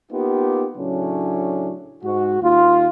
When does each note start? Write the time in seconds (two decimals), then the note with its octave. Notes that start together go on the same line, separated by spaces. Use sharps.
0.11 A#3 B3 D#4 F4 G4
0.76 A2 C#3 F#3 A3 C#4 D4
2.03 G#2 F#4
2.42 D#2 F4